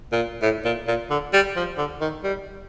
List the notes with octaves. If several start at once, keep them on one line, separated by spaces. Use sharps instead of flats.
A#2
A2
A#2
A#2
D3
G3
F3
D3
D#3
G3